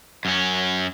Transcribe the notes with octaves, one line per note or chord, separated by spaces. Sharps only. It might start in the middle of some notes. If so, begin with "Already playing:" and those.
F#2 C#4